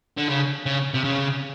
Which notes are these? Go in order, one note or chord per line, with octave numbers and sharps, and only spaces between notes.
D3
C#3
C#3
C3
C#3